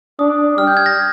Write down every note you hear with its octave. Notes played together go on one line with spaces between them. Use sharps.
D4 D#6
G3 F6
G6
G#6
A#6